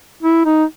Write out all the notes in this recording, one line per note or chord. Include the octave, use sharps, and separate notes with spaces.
E4
D#4